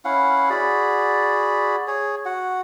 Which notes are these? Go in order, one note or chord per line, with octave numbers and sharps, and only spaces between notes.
C#4 E4 F5 F#5
F#4 G#4 D5 B5
G#4 C#5
F#4 F#5